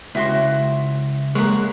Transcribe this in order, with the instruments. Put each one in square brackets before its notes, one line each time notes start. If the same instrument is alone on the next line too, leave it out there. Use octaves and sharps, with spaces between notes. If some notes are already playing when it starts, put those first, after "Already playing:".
[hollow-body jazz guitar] C#2 [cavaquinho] E4 F#4 C6
[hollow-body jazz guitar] G#3 A#3 [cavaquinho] C#5 F#5 B5